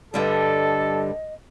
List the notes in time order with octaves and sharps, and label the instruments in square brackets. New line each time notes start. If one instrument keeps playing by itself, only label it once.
[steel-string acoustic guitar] G2 D3 G3 [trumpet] A4 [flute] D#5